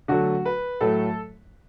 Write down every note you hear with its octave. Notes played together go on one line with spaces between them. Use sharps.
D3 F#3 A3 F#4
B4
A2 F#3 A3 A4